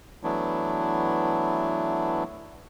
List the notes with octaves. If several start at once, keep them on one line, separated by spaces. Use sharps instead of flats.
E3 F#3 A3 B3 D4 E4